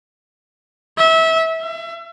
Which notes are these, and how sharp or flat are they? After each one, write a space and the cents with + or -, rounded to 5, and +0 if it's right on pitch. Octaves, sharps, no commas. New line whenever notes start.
E5 -25
E5 +35